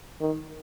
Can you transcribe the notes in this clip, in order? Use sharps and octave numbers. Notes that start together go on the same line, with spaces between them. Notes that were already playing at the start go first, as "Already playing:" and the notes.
D#3